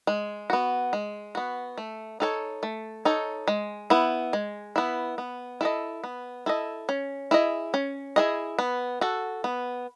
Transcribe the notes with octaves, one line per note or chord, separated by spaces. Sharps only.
G#3
B3 F#4
G#3
B3 F#4
A3
D#4 A4 C#5
A3
D#4 A4 C#5
G#3
B3 E4
G#3
B3 E4
B3
E4 A4 D#5
B3
E4 A4 D#5
C#4
E4 G#4 D#5
C#4
E4 G#4 D#5
B3
F#4 A4
B3